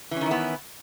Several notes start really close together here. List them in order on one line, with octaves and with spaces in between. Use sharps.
E3 C#4 D#3 E4 B3